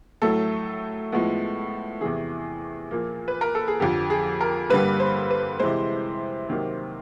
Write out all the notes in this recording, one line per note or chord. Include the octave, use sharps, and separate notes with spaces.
A2 F#3 A3 A4
A2 F3 G#3 B3
E2 C3 E3 G#4
A#2 F3 A#3
B4
A#4
A4
G#4
F2 D3 F3 G4
G#4
A#4
G2 D3 G3 A#3 B4
C5
B4
C3 E3 G#3 C5
C3 D#3 F#3 A#3